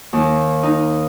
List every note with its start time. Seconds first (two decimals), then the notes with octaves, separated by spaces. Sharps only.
0.13 D#2
0.63 D#4